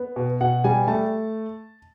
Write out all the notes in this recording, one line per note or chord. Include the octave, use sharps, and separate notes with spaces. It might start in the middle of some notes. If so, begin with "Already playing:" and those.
Already playing: B3
B2
B2 F#5
G3 G#5
A3 A5